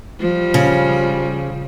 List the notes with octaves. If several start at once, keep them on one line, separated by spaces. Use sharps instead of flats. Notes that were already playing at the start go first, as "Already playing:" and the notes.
F3 G3
C#3